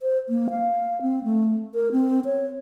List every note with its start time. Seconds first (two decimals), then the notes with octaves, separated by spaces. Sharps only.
0.01 C5
0.29 A#3
0.50 F5
1.02 C4
1.24 A3
1.74 A#4
1.92 C4
2.25 C#5